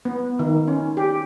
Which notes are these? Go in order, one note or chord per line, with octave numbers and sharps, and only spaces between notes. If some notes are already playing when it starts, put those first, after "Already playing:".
B3
D#3
C#4
G4